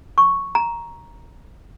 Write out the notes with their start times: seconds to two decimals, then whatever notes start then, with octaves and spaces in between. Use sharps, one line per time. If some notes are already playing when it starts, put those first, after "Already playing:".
0.18 C#6
0.55 A#5